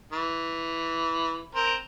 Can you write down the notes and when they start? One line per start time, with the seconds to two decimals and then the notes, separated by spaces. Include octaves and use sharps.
0.13 E3
1.55 C4 A#4